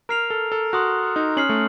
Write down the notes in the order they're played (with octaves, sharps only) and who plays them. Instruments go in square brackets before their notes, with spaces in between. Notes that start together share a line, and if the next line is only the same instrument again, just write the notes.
[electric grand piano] A#4 [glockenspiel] A#5 F6 C7 F7
[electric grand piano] A4
A4
[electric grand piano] F#4 [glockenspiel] C6 D#6 F#6
[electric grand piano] D#4
[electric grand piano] C#4 [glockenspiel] F6 C7 F#7
[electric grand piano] A3